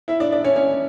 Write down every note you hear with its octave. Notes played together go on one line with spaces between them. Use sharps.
E4 E5
D4 D5
D4 D5
C#4 C#5
C#4 C#5